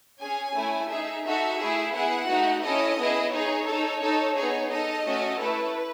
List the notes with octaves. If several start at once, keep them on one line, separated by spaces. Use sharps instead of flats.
C#4 G#4 G#5
A3 C#4 E4
D#4 G#4 E5
D#4 F#4 A4 E5
A3 E4 G#4
B3 E4 G#4 F#5
A3 D#4 F#4
C#4 E4 A4 D#5
B3 E4 G#4
D#4 G#4 C#5
D#4 A4
D#4 A4
B3 D#4 G#4 C#5
D#4 A4 D#5
A3 C#4 F#4 A4
A3 E4 A4 B4